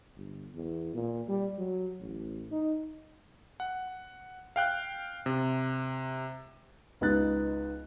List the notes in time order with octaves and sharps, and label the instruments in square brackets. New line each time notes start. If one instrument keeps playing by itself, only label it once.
[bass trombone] G1
E2
A#2
G3
F#3
A1
D#4
[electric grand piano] F#5
F5 G5 F#6
C3
[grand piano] C#2 B3 D#4 G4 F#6 A6